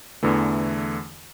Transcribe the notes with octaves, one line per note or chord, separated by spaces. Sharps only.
E2 D3 E3 A3